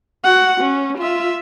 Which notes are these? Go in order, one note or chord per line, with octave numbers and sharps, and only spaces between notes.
F#4 F#5
C#4
F4 E5